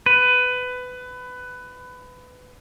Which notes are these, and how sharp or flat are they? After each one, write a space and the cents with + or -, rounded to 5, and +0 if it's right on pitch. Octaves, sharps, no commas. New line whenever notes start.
B4 +20